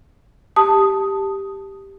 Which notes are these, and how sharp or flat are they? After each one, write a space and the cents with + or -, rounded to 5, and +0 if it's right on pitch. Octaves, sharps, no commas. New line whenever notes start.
G4 +0 A5 +0 D#6 +0